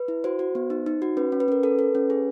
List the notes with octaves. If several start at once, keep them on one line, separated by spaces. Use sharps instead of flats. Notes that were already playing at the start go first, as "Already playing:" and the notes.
Already playing: B4
E4
F#4 C5
F#4
B3
D#4
D#4
F#4
C#4 B4
C#4
B4
C#4 A#4
A4 B4
A4
C#4
G#4